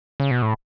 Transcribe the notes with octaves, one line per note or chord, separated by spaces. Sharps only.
C#3
B2
A2